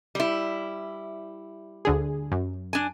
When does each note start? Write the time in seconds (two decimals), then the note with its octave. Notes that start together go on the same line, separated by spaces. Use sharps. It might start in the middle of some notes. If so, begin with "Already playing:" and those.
0.15 G3 E4
1.85 D2 D3 G#4
2.32 F#2
2.73 D4 G#5